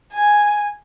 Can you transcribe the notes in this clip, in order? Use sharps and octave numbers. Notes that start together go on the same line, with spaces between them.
G#5